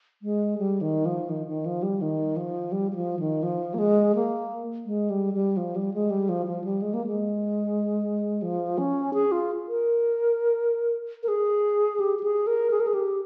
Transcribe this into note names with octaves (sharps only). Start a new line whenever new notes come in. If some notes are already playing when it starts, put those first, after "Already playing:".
G#3
G3
D#3
F3
D#3
D#3
F3
G3
D#3
F3
G3
G3
F3
D#3
F3
A#3
G#3
A#3
G#3
G3
G3
F3
G3
G#3
G3
F3
F3
G3
G#3
A#3
G#3
F3
C#4
G#4
F4
A#4
A#4
G#4
G4
G4
G#4
A#4
G#4
A#4
G#4
G4